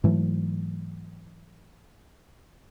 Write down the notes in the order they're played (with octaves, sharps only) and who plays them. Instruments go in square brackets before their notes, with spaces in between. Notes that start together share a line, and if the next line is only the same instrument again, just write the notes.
[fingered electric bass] G#2 E3 F#3 A3